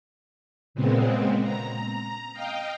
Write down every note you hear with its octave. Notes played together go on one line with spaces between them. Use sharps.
A#2 C#3 G#3 B3 C4
A#5
D#5 F5 G5